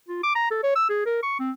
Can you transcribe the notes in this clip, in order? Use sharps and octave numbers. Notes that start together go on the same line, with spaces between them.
F4
D6
A#5
A4
C#5
E6
G#4
A#4
C#6
C4